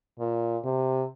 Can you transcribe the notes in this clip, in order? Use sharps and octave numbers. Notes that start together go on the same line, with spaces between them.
A#2
C3